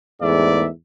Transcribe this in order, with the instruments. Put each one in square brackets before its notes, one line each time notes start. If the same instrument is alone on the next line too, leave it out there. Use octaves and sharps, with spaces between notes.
[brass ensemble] E2 G#2 A3 D5 E5